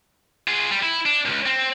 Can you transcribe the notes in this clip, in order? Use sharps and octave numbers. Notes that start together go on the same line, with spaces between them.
F4 G#4
G3
E4
D4
C#2 G2
C4